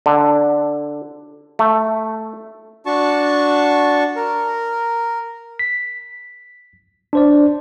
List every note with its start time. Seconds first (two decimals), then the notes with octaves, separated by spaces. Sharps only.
0.06 D3
1.59 A3
2.86 D4 F#4 A5 C#6
4.16 A#4
5.59 B6
7.13 D4 C5 D5